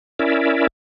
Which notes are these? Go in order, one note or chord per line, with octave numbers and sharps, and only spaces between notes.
C#4 E4 A#4 D5 E5